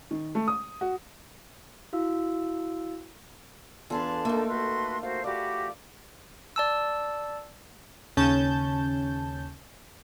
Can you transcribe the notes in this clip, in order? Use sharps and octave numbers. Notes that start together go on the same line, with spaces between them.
D#3
A3
D#6
F#4
E4 F#4 F5 E6
E2 D4 F4 G#4 A4 B4 A5 C6
A3 A#3 D#4 A#4
F#4 B4 C6
F#4 C5 F5
F#4 G4 D5 F5 B5
D5 A5 E6
D#2 C#3 C#4 A5 G6